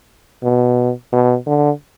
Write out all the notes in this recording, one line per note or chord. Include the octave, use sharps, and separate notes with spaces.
B2
B2
D3